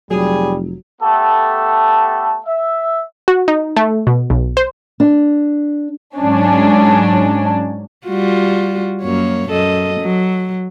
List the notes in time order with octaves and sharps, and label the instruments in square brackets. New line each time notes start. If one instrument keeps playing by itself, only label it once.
[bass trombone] F1 [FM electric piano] F#3 [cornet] G3 [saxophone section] G#4
[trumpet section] A3 B3 G4 A4 A5
E5
[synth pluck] F#4
D#4
A3
B2
B1
C5
[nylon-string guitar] D4
[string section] G#2 F#3 C#4 D4
[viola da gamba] G3 F4 F#4
F#2 A#3 C#5
F#2 A4 D#5
F#3